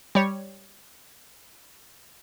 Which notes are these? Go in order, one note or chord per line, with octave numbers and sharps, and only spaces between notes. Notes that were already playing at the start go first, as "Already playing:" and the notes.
G3 C#5